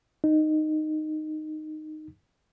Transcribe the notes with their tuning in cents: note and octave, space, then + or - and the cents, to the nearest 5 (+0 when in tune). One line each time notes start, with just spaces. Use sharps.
D#4 -10